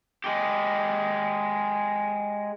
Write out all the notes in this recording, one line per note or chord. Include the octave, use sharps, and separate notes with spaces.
G#3 G4